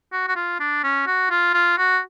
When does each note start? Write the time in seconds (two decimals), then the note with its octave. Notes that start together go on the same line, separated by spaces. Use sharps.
0.13 F#4
0.28 F#4
0.36 F4
0.60 D4
0.84 C#4
1.07 F#4
1.31 F4
1.54 F4
1.78 F#4